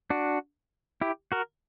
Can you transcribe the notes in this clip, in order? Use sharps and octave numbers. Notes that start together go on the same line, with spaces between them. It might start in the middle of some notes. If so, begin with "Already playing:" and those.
D4 F#4
E4 G4
F#4 A#4